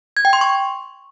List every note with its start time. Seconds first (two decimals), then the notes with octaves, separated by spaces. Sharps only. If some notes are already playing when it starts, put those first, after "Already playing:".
0.17 G#6
0.25 G5
0.33 C6
0.41 C#6